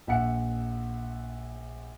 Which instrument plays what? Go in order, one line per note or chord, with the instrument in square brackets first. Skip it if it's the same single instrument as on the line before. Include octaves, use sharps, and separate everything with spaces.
[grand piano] A#1 E5 F#5 C#7